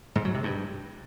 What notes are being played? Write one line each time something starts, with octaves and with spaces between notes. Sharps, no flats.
G#2
F#3
C3
G2